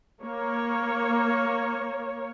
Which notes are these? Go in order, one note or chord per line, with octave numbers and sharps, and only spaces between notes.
A#3 C#5